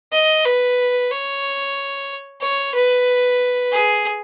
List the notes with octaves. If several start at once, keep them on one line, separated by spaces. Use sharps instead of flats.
D#5
B4
C#5
C#5
B4
G#4